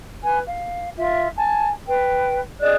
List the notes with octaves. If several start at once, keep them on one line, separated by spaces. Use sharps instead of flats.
B4 G#5
F5
F4 E5
G#5 A5
B4 G5
G#4 D5 D#5 F#6